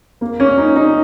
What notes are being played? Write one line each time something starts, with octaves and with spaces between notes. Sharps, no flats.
A#3
C#4
D#4
D#4